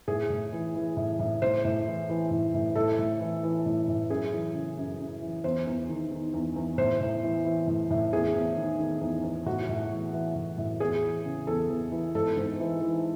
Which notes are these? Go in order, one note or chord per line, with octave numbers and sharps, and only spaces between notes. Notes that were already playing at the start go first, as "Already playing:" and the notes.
A2 G#4
A2
E3
E3
A2
A2
A2 C5
A2
E3
E3
A2
A2
A2 A4
A2
E3
E3
A2
A2
F#2 G#4
E3
C#3
F#2
F#2
E3
E2 C5
E2
D#3
D#3
E2
E2
A2 C5
A2
E3
E3
A2
A2
E2 G#4
E2
D#3
D#3
E2
E2
A2 F#4
A2
E3
E3
A2
A2
E2 G#4
E3
C#3
E2 A4
E2
E3
G#2 A4
G#2
E3
E3